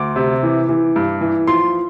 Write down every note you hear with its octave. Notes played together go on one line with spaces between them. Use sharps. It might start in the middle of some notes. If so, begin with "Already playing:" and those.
Already playing: D2 D6
C3
E3
E3
G2
E3
F3 C6